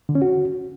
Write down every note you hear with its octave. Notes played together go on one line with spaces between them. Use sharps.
D3
C#4
F#4